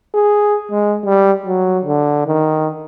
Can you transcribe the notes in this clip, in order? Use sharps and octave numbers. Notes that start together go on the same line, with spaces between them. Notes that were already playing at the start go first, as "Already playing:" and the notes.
G#4
G#3
G3
F#3
D3
D#3